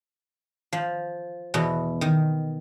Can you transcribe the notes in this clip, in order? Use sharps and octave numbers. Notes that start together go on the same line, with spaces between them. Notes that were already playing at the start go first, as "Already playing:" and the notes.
F3
E2 B2
D#3